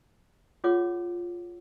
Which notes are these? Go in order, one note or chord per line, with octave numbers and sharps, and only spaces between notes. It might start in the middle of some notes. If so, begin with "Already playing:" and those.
F4 G#4 C#5 F#5 D6